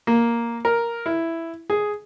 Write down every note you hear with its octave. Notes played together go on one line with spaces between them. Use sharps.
A#3
A#4
E4
G#4